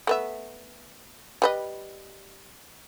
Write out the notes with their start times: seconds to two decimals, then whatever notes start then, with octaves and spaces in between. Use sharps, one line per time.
0.07 A3 B3 E5
1.42 G3 B4 D#5